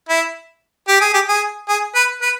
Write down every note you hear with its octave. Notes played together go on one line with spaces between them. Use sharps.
E4
G4
G#4
G4
G#4
G#4
B4
B4